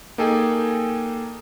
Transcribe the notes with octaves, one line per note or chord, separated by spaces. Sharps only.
A#3 D#4 G#4 A4 G5 G#5